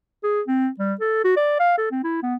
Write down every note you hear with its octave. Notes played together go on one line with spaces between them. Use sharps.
G#4
C4
G3
A4
F#4
D5
F5
A4
C4
E4
B3